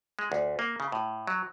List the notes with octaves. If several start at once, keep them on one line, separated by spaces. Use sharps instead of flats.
G#3
D2
A#3
C#3
A2
F#3